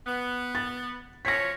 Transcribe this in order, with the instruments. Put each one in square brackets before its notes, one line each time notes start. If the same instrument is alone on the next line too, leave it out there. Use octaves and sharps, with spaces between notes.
[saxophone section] B3
[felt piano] A6
[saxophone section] F3 C#4 C#5 [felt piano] A#6 B6